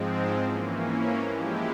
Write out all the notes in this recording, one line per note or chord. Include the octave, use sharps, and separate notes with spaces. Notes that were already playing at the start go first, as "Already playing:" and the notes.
Already playing: G#2 F3 G#3 C4
E3 A#3 C#4
F3 G#3 E4 G4